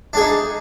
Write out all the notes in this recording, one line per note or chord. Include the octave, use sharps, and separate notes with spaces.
D4 D#4 G#4